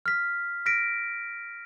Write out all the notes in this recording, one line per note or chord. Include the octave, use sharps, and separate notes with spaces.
F6 B6
F6 A#6 B6 D7